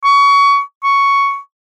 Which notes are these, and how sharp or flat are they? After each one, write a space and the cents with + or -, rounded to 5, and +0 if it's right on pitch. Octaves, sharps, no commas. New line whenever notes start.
C#6 +25
C#6 +5